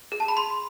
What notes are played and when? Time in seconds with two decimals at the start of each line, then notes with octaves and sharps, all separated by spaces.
0.12 G#4
0.20 A5
0.28 B5
0.37 C6